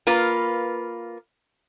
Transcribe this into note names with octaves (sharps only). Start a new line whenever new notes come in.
A#3 F4 B4